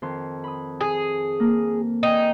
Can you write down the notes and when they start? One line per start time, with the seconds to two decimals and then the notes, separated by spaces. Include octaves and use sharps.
0.02 F2 D#3 C6
0.44 B5 D#6
0.81 G#4
1.40 A#3
2.03 D#4 G5 G#5